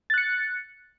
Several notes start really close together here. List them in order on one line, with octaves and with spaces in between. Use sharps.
A6 F#6 C#7